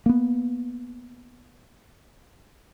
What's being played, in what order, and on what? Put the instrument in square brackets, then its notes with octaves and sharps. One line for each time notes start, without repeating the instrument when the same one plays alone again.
[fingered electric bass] A#3 B3